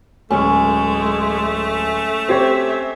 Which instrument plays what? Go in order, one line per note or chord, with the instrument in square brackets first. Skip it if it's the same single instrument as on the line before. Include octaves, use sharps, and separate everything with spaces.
[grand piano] D1 [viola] G#3 [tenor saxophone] A3 [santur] C#4
[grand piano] C4 G4 C#5 [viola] E5